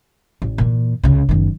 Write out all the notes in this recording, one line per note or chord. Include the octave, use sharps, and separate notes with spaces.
A1
A#2 E3
C#2 C#3
F#1 D#3